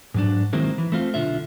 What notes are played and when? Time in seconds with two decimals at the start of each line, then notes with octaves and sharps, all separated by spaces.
0.14 G#2 F#3 D4
0.53 D#3 F#3 G#3 A#3 C4 E4
0.78 E3
0.92 A3 C4 F4
1.14 B1 D3 F4 E5